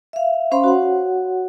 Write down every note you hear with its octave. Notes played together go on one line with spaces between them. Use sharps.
E5 F5
C#4 C5 F5 B5 C6
F#4 C#5 F#5